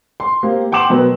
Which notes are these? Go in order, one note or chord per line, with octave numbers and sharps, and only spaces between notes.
C6
A#3 C4 G4
F#5 G5 C6 D6 E7 F#7
B2 F#3 B3 A#4 B4